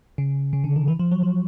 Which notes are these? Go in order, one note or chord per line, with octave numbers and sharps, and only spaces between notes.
C#3
C#3
D3
D#3
E3
F3
F#3
F3